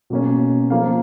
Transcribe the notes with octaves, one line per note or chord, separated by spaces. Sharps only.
B2 A#3 C#4
F3 A#3 C#4 F5